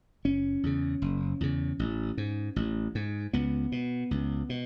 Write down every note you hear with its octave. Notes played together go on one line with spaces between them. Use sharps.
F#1 C#4
E2 C#3
F#1
E2 C#3
A1
G#2
A1
G#2
C#2 B3
B2
C#2
B2